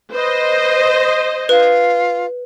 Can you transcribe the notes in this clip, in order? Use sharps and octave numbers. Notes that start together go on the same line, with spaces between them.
B4 C5 D#5
F4 B4